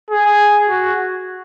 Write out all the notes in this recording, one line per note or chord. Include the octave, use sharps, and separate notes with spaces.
G#4
F#4